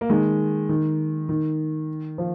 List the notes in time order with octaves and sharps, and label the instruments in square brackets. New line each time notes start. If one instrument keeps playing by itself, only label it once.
[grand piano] A#3
D#3 G#3
D#3
D#3
F3